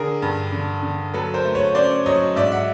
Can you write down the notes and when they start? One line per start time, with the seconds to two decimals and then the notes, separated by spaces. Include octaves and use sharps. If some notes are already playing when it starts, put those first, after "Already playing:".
Already playing: D3 G#4 A#4
0.22 G2
0.52 D3
0.83 D3
1.14 F#3 A4 B4
1.34 A#4 C5
1.45 A3
1.55 B4 C#5
1.75 C#4 C5 D5
2.06 F#3 C#5 D#5
2.36 G#2 D5 E5
2.51 E5 F#5